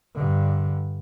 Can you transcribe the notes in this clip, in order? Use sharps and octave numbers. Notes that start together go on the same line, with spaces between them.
G2 D3